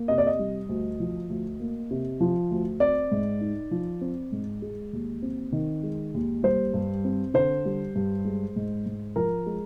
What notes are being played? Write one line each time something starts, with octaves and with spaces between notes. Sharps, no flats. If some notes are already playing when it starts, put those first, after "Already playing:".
Already playing: A#3
C3 D#5
D5
D#5
G3
D2
F3
D2
A#3
C3
F3
D2
C4 D5
G#2
D#4
F3
C4
G#2
G#3
D#2
C4
D#3
G#3
D#2
G3 C5
G2
C4
D3 C5
G3
G2
G#3
G#2
G#2
F3 A#4
G#3